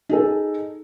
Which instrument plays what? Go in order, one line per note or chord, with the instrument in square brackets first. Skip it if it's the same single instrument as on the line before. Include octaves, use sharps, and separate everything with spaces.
[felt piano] D#4 G#4 A4